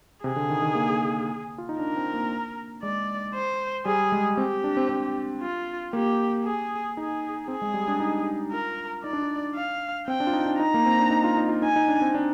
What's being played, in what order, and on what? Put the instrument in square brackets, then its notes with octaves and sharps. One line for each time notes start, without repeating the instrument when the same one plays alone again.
[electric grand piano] C3 [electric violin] G#4
[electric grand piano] D3
D#3
D#3
A#3
F4
D#4
[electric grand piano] D4 [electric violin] A#4
[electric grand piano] C4
A#3
[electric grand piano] G#3 [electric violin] D5
[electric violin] C5
[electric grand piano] G3 [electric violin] G#4
[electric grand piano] G#3
[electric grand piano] C4 [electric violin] G4
[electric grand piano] D4
C4
C4
[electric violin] F4
[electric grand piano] A#3 [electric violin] G4
[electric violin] G#4
[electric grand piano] D#4 [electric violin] G#4
[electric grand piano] C4 [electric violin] G#4
[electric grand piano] G#3
G3
D4
D#4
[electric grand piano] F4 [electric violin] A#4
[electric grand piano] D#4 [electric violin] D5
[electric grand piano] D4
D#4
[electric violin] F5
[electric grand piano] C4 [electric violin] G5
[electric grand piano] D4
F4
D#4
D4
[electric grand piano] D#4 [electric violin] A#5
[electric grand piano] A#3
C4
D4
D#4
F4
D#4
F4
[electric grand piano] D#4 [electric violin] G#5
[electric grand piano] D#4
D4
C4
D4